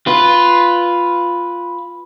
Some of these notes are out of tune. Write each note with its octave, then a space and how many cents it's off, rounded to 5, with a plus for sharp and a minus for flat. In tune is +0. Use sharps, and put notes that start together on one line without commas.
F4 +0 B4 +0